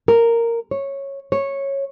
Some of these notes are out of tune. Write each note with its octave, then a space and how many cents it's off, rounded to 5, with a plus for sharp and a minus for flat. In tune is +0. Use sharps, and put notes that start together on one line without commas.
A#4 -10
C#5 -10
C#5 -10